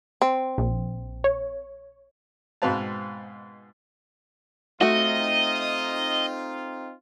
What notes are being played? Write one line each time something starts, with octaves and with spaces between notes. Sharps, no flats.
C4
A#1
C#5
G#2 B2 C4 B4 F5 A5
A3 C4 D#4 F4 F#4 D#5